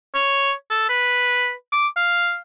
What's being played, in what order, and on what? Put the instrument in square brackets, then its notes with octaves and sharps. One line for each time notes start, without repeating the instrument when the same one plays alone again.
[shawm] C#5
A4
B4
D6
F5